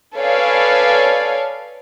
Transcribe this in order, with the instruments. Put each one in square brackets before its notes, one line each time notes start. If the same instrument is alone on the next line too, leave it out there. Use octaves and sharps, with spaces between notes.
[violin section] A4 B4 C#5 D5 F5 G#5